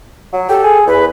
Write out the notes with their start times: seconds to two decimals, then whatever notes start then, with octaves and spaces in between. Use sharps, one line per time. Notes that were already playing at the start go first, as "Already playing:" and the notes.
0.33 F#3
0.49 G4 A4
0.64 G#4
0.87 E2 B4